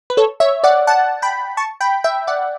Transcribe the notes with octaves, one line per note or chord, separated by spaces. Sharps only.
B4
A4 C#5
C#5 E5
D5 F#5
F#5 A5
G5 B5
A5 C#6
G5 B5
E5 G5
D5 F#5